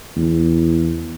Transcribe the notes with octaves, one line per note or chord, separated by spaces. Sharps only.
E2